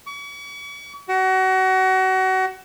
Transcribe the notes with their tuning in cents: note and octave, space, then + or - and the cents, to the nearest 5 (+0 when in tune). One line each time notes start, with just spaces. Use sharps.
C#6 +40
F#4 +30